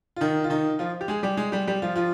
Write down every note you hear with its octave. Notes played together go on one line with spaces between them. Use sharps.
F4
D#3 D#4
F4
D#3 D#4
F3 F4
G4
G#3 G#4
G3 G4
G#3 G#4
G3 G4
G3 G4
F3 F4
F3 F4